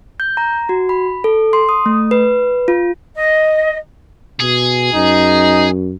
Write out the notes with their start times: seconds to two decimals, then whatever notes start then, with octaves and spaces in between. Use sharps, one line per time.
0.20 G6
0.37 A#5
0.69 F#4
0.89 B5
1.24 A4
1.53 C6
1.69 D#6
1.86 A3
2.11 B4
2.68 F4
3.15 D#5
4.40 B2 G#4
4.94 F#2 D#4